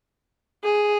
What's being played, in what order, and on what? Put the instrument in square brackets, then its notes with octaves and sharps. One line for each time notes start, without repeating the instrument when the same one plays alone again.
[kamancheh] G#4